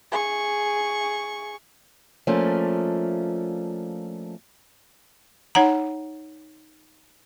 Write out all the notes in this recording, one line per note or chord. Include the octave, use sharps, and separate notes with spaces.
G#4 C#6
F3 A3 A#3 C#4 D4
D#4 C#5 F#5 A#5